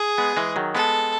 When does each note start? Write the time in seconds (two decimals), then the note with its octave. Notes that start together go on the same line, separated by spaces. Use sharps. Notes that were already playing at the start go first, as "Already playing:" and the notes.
Already playing: G#4
0.18 G#3 B3
0.37 E3 G#3
0.56 D#3 F#3
0.75 G#3 B3 A4